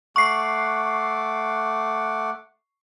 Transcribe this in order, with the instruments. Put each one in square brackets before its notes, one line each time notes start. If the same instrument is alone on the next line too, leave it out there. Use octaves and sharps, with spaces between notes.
[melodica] A3 F#5 D6 [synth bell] C#6 C7